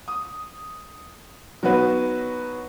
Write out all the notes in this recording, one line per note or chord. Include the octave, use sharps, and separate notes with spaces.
D#6
F#3 B3 D#4 F#4 B4